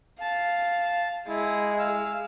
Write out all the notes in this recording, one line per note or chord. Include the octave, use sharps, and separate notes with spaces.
F5 A5
G#3 E4
F5 E6